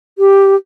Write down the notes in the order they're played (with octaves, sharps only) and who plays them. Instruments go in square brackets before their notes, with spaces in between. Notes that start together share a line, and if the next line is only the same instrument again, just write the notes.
[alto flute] G4